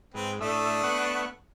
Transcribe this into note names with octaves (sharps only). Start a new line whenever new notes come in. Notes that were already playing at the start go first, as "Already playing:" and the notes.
G#2 C4 B4
A2 A3 D4 E5 D#6
B3 F#5 C#6